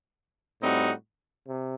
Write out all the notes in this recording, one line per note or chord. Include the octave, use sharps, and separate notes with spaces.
A2 G3 C4 D#4 F#4
C3